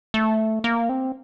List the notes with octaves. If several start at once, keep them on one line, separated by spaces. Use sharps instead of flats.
A3
A#3
C4